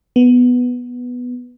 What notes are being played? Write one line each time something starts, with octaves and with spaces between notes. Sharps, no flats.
B3